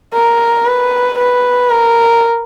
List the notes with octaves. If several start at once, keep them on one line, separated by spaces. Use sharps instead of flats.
A#4
B4
B4
A#4